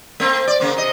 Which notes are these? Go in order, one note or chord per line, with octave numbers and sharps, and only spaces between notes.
A3 C4
D5
C#3 A#3 C4
C3 D#5